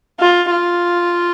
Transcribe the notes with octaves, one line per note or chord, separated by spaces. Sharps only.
F4
F4